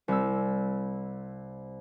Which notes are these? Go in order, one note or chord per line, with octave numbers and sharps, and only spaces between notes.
C2 E6